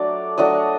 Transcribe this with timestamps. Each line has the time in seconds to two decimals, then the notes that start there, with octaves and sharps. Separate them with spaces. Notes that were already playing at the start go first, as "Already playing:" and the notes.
Already playing: F#3 A3 D4 D5
0.38 F#3 A3 D4 D#5